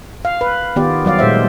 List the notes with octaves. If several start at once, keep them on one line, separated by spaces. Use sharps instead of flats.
F5
B4
D#3 B3 F4 G4 D5
F#3 G3 D5 F5
A#2 G#3 C5 E5